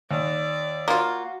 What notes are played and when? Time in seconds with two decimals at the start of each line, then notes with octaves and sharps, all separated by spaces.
0.11 D#2 D5
0.88 A#3 F4 F#4